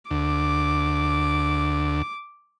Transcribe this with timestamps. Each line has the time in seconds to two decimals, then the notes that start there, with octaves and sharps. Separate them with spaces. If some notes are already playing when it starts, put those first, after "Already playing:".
0.11 D2 D6